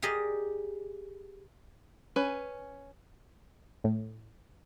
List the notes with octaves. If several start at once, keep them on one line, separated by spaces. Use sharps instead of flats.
G4 G#4 A#4 D5 D#5
C#4 B4 G#5
A2